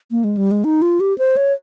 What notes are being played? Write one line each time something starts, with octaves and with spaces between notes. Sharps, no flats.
A#3
G#3
G3
G#3
D#4
F4
G4
C5
C#5